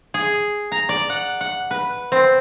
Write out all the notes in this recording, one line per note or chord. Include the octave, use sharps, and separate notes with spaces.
G#4
A#5
D5
F#5
F#5
B4
C4